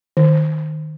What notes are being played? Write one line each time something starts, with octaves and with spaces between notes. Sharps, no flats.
D#3